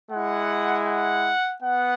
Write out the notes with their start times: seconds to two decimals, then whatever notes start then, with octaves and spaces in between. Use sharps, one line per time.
0.11 G#3 E4 F#5
0.87 F#5
1.62 B3 F#5